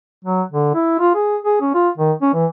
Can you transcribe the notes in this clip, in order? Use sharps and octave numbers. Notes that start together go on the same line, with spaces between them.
F#3
D3
E4
F4
G#4
G#4
C#4
F4
D#3
C#4
E3